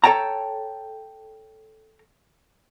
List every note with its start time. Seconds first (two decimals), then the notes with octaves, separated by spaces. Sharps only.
0.04 A4 C#5 G5 A5 A#5